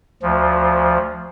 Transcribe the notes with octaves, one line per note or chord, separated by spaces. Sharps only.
D2 F3